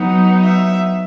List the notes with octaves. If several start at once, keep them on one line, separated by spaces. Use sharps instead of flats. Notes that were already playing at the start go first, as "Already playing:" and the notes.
Already playing: F#3 B3 D#4
E5